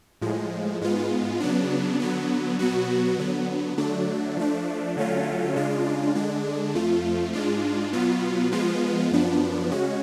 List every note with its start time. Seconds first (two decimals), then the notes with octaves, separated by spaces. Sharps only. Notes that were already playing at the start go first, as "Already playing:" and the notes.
0.22 A2 F3 G#3
0.81 G#2 G#3 B3 F4
1.40 C#3 F#3 B3 D4
2.00 D3 F#3 B3
2.59 B2 F#3 B3 F#4
3.19 D3 F#3 B3
3.77 D3 F#3 A3 D4
4.37 F3 A3 D4
4.96 D3 F#3 A3 C#4 F4
5.56 C#3 G#3 D4 F4
6.15 D3 G#3 D4
6.74 F2 F3 A3 F4
7.33 G#2 G#3 D4 F4
7.93 B2 F#3 B3 F4
8.52 F3 G#3 B3 F4
9.11 F#2 F3 B3 D4
9.70 C#3 G#3 C#4 F#4